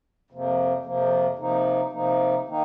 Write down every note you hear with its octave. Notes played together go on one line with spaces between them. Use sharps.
F2 C3 F3 A#3
F2 C3 F3 A#3
C3 F3 A#3 D#4
C3 F3 A#3 D#4
D#3 A#3 D#4